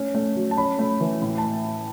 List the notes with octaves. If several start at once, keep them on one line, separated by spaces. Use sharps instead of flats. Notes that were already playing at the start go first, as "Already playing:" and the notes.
Already playing: A3 C#4
A3
F#3
A5
C#4 B5
A3
E3
A2
A5